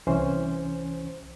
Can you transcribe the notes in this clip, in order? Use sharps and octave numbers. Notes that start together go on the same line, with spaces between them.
C2 E3 C#4 C5